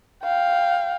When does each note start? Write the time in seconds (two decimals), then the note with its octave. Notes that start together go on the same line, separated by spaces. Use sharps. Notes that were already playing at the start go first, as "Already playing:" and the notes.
0.23 F5 G5